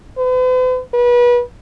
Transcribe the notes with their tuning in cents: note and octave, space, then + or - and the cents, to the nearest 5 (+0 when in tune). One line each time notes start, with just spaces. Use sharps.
B4 +45
B4 -30